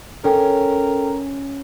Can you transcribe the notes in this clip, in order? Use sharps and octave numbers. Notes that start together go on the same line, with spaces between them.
C#4 A4 A#4 G5